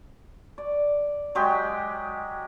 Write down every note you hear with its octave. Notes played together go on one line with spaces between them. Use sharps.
D5
F#3 G#3 G4